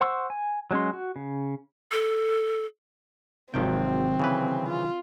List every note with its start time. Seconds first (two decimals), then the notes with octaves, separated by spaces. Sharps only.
0.01 C5 F#5 C6 C#6 E6
0.30 G#5
0.71 F#3 G#3 C#4 C6
0.93 F#4
1.16 C#3
1.92 A4
3.54 G#1 C3 D#3 F3 F#3 C4 G5
4.19 C#3 E3 B4
4.69 F4